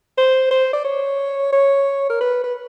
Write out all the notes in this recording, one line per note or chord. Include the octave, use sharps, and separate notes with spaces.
C5
C5
D5
C#5
C#5
A#4
B4
B4